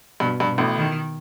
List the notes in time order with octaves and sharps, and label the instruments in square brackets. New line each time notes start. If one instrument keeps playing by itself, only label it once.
[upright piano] G2 [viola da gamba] B2
[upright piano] G2
[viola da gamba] B2
[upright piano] A1 A2
[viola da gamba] D#3